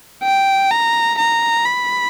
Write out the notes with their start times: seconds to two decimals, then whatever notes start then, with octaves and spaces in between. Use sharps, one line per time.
0.24 G5
0.71 A#5
1.19 A#5
1.66 B5